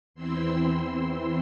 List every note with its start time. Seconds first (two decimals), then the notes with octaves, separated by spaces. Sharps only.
0.14 E2 E3 C4 E4 C6 E6
0.68 C6 E6